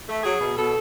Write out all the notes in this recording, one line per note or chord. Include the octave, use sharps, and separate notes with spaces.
A3
F#3 G#4
B2
B2 A4